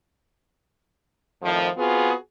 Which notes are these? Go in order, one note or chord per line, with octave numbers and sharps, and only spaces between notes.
F2 A2 D#3 F3
B3 C4 F4 F#4 G#4